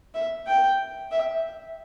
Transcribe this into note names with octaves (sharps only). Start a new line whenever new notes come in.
E5
G5
E5